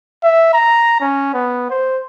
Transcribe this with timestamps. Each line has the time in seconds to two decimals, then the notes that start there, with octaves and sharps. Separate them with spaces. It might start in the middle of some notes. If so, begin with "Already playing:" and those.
0.23 E5
0.53 A#5
1.01 C#4
1.34 B3
1.70 C5